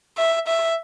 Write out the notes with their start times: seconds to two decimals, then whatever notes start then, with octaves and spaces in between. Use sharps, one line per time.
0.18 E5
0.47 E5